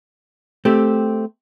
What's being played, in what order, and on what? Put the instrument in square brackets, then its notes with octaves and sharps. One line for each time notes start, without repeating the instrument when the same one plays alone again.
[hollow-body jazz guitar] A3 C4 G4